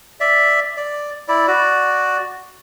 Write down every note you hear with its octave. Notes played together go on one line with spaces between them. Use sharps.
D5 E5
D5
E4 D5
F#4 D5